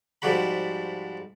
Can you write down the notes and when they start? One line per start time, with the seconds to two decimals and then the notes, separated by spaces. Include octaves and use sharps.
0.22 G#2 F3 G3 F#4 B5